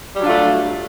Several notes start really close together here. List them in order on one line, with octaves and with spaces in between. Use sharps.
G3 F#3 D4 F4 A3